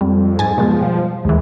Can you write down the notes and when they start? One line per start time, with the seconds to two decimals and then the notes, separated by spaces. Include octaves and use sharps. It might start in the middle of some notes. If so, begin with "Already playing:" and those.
0.01 F2 G3
0.39 G#2 G#5 A6
0.58 B2 F3 G#3
0.81 G3
1.25 D#2 E3 G#3